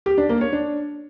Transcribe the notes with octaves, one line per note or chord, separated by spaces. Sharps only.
G4
D4
A#3
C#5
D4